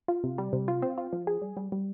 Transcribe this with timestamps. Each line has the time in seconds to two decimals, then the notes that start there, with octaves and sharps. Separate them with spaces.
0.08 F4
0.24 C3
0.38 G3
0.53 C3
0.68 F4
0.82 C4
0.98 F4
1.13 F3
1.27 G#4
1.42 G3
1.57 G3
1.72 G3